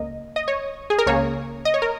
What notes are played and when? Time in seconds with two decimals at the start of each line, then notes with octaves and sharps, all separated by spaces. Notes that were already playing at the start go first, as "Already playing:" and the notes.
Already playing: C#2 C#3 A#3 D#5
0.36 D#5
0.48 C#5
0.90 G#4
0.98 A#4
1.06 C#2 C#3 A#3 C#5
1.65 D#5
1.74 C#5
1.82 A#4